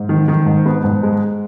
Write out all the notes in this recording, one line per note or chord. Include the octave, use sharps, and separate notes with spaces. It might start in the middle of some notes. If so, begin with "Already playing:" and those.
Already playing: G#2
D#3
D#3
G#2
B3
G#2
G#3